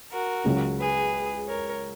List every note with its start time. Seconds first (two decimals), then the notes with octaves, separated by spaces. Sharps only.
0.11 F#4 A#4
0.44 C#2 C#3 F#3 C#4
0.78 G#4 B4
1.47 A#4 C#5